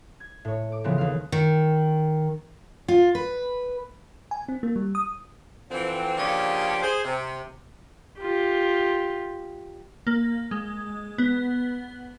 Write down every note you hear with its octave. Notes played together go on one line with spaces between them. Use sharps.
G#6
A2 C#5
D6
C#3 E3 F3 G#3 B3 C4
D#2 F5
D#3
F4
B4
G#5
C4
A#3
G3
D#6
D3 E3 F3 C4
C#3 F3 A#3 C#4 D4 G4
G#4 C5
C3
F4 G4
A#3
G#3
B3